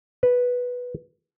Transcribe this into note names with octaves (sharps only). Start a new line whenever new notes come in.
B4